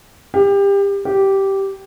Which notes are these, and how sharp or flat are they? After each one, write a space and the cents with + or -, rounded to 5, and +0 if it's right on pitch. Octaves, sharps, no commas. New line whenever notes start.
G4 +25
G4 -10